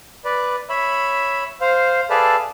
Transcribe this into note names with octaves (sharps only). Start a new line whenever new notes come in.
B4 D5
C#5 E5 B5
C5 F5
G#4 A4 B4 D5 E5 F5